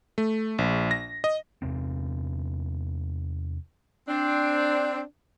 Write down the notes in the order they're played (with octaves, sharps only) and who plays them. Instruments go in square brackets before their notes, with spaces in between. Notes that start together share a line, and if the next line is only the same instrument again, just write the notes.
[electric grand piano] A3
A#1
A#6
D#5
[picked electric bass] E2 C3 C4
[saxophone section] C4 D4